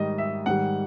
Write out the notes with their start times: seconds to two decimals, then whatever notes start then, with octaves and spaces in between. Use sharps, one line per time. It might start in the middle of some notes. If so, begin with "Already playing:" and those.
Already playing: G#2 D#3 G3 D#5
0.18 E5
0.46 G#2 D#3 G3 F#5